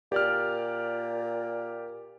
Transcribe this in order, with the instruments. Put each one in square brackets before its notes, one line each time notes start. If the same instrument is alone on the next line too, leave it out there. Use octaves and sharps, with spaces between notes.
[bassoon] A#2 [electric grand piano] G4 D5 F6